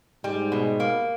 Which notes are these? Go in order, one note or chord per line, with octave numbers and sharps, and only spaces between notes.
G#2 G3 G#3
B2
A#3